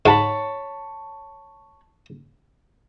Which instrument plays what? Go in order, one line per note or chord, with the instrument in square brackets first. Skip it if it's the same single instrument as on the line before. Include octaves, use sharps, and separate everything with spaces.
[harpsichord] G#2 [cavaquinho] C#5 A5 B5